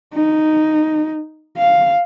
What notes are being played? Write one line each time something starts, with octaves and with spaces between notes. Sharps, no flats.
D#4
F5